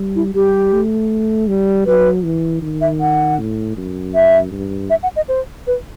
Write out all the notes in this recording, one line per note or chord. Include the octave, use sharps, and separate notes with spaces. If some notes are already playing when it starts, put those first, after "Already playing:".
Already playing: G3
E4
G3 G4
A3
G3
F#3 B4
E3
D#3
E5
F#5
A2
F#2
E5
G2
E5
F#5
D#5
C5
B4